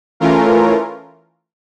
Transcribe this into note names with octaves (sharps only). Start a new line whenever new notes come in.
E3 A3 C#4 F4 A#4